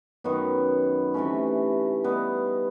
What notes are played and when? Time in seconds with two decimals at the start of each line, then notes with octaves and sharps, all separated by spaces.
0.24 F#2 D#3 F#3 B3
1.14 C3 E3 A3 C#4
2.04 G3 B3 D#4